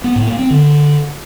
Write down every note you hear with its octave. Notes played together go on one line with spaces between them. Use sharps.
B3
A2
A#3
C4
D3